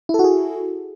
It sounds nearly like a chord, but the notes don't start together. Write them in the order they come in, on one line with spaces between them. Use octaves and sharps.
E4 A4 F#4 G#4